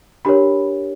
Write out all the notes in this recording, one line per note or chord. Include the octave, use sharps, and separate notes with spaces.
D4 G4 A#4 C#5 B5